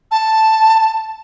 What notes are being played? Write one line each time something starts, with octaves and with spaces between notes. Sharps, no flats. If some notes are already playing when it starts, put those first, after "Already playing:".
A5